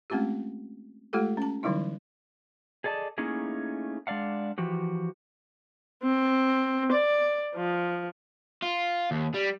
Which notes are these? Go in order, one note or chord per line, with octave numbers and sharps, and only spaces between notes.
G#3 A3 C4 C#4 F4 G4
G#3 A3 F4 G4 A4
C#4 A5
D3 E3 F#3 G3 D#4 E4
G#4 A4 D5 D#5 A5
A3 A#3 C#4 D#4 E4 G#4
G#3 D4 D5 F5 F#5
E3 F3 F#4 G4
C4
D5
F3
F4
D#2
G3